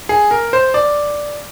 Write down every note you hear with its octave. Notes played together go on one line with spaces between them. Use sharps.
G#4
A#4
C5
D5